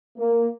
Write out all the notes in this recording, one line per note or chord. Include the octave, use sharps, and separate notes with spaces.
A#3